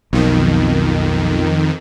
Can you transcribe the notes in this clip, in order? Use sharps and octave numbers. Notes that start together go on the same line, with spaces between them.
B1 F2 D#3